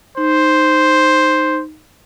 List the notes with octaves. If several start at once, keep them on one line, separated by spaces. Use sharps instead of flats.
D#4 C5